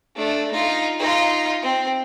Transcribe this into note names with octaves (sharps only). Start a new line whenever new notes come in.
A3 D4
D#4 F4
D#4 F4
C4